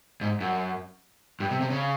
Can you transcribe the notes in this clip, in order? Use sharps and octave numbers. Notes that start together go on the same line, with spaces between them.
G#2
F#2
G2
C3
C3
C#3